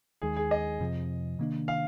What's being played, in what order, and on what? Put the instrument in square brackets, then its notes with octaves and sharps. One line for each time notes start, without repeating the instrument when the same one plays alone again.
[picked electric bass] D#2 D#3 G#3 [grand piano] G#4
[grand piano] G#4
D#5
[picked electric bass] F2 C3 F3
C3 D#3 A#3 D4
[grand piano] F5